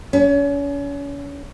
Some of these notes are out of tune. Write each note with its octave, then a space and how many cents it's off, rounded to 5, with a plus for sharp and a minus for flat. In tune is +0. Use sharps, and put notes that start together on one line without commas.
C#4 +35